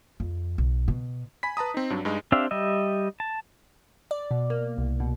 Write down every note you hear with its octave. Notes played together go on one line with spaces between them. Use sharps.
F2
B1
B2
G#5 B5 B6
B4 A5 A#5 D#6
C4 D#4
G2 F#3 D4
G2 G#3 D#4
C4 D4 G4 E5 F5
G3 G4 D#5 E5
A5
D5
B2
A#3
C2
B2